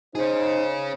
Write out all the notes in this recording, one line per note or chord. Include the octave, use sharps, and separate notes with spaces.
C#4 D#4 G#4 C5